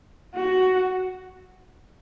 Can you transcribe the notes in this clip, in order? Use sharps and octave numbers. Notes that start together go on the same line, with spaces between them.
F#4